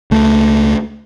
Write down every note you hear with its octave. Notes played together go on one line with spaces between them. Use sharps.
C#2 A3